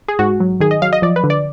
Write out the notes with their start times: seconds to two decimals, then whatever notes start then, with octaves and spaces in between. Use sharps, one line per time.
0.08 G#4
0.19 G#2 F#4
0.40 F#3
0.60 D#3 G#4
0.71 D#5
0.82 F#3 F5
0.93 D#5
1.02 F3 D5
1.16 B4
1.24 D3
1.30 D5